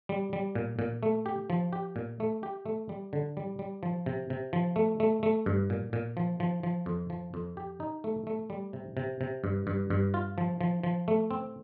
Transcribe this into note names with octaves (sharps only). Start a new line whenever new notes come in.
G3
G3
A#2
A#2
A3
G4
F3
G4
A#2
A3
G4
A3
G3
D3
G3
G3
F3
C3
C3
F3
A3
A3
A3
G2
A#2
A#2
F3
F3
F3
F2
F3
F2
G4
D#4
A3
A3
G3
C3
C3
C3
G2
G2
G2
F4
F3
F3
F3
A3
C4